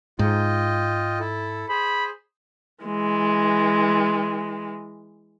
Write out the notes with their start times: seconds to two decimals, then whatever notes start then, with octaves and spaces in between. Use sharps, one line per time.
0.19 G#2 F4 D#5 G5
1.20 E4 A4
1.69 G#4 C5 B5
2.84 E3 G#3